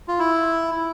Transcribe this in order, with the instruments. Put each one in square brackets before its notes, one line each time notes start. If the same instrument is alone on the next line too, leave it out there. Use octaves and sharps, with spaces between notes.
[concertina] F4
E4